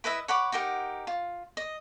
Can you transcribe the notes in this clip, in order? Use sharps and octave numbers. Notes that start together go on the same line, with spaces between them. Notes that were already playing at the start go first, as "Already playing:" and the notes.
E4 B4 D#5 E5
C#5 F#5 B5 D6
D#4 G4 A#4 F#5
F4
D#5